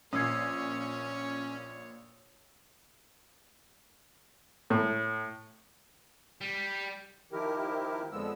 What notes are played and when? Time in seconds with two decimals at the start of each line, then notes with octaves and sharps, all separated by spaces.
0.13 A#1 A#2 C#4 C#5 D#6 E6 G#6 C7
4.70 A2
6.41 G3
7.32 D#3 F3 E4 G4 A#4
8.12 F2 D3 F3 G#3 B3 E6